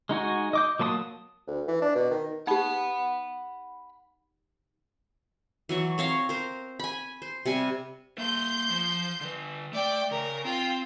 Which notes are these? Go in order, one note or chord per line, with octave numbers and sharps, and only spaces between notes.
G#3 D#4 F#4 G#5
D#5 D6 G6
F#3 A#3 A5 B5 D#6
D2
E3
D4
B2
D#3
D#4 G4 F#5 B5
E3 F#3 C#6
C4 C#5 F5 A#5
A#4 C5
G#5 B5
C5
C3 G3 G#5
A#3 E5 C6 G6
F3 C5
D3 B4
A3 D5 G5
C#3 A#4
C4 F4 G5